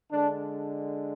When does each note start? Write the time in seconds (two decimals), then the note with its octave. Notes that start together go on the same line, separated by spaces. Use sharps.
0.11 D3 G#3 D4